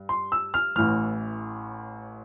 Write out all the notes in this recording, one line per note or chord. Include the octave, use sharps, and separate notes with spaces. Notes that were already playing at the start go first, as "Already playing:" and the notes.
Already playing: G2
C6
E6
F6
A1 A2 E3 F6